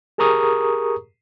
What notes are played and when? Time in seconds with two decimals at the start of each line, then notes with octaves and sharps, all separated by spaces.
0.18 G4 G#4 A#4 A#5 C#6 D#6